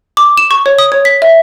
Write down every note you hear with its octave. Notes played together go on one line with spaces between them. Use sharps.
D6
E7
C#6
C#5
D#6
C#5
B6
E5